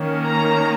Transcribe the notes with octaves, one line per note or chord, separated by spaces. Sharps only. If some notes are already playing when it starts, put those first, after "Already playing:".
Already playing: D#3 A#3 C#4
A#5